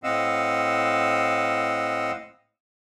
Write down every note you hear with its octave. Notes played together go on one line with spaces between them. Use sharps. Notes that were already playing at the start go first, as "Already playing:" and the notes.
A2 C4 D#5 F5 F#5 E6